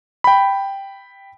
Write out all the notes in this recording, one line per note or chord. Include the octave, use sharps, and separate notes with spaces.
G5 B5